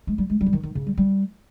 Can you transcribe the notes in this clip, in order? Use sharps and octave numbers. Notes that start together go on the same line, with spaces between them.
G#3
G3
G#3
G3
F3
D#3
D#3
C#3
G3
G3